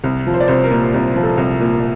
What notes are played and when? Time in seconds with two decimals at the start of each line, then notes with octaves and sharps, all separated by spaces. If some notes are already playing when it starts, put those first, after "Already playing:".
0.04 C2
0.27 F3
0.34 C5
0.40 D5
0.48 C2 C5
0.64 A#4
0.71 A#2
0.94 C2
1.16 F3
1.23 A4
1.38 C2
1.60 A#2